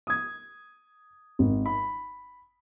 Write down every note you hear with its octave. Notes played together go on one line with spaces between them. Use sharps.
D#6 G#6
G#1
B5